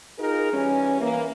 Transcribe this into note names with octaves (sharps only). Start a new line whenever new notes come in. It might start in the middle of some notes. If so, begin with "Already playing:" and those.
D#4 F4 G#4 A#4
E3 G3 C#4
E3 A#3